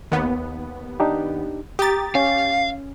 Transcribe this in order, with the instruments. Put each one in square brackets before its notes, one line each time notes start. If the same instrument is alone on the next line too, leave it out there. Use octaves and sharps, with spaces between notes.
[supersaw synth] D#2 B3
[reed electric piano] D4 D#4 G4
[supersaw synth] G4 A6 [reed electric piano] A#5 D#6
[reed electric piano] C#4 [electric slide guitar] F5